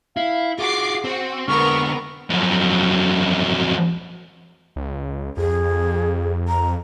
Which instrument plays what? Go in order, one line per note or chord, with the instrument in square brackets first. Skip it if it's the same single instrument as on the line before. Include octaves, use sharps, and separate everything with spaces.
[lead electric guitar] E4 [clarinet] F5
[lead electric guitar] F4 F#4 [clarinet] G#4 [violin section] D6 C7
[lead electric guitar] C4 [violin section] F#4
[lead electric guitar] D3 G#3 [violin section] B3 A#4 [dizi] C#6 [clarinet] F6
[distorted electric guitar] F2 F#3
[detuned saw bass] C#2
[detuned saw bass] F2 [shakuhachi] G#4
[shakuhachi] A#5